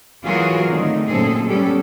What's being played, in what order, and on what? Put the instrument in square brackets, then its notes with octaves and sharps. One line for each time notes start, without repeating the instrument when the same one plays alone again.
[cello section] E3 F#3 F4 F#4 G#4 A#4
D3 D#3 A3 C4 D#4
F#2 A#2 C4 G#4 A4
G3 B3 C#4 G4 A4